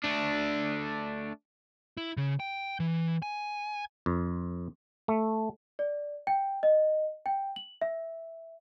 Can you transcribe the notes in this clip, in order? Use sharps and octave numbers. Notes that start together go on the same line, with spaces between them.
A3 D4
E4
C#3
G5
E3
G#5
F2
A3
D5
G5
D#5
G5
F#7
E5